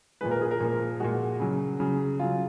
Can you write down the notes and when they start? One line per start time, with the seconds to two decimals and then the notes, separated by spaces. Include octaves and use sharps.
0.21 A#2 F3 G#3 B4
0.31 A#4
0.41 G#4
0.51 A#4
0.61 A#2 F3 G#3
1.00 A#2 F3 G#3 F#4
1.40 C#3 F#3
1.80 C#3 F#3
2.19 C#3 F#3 F4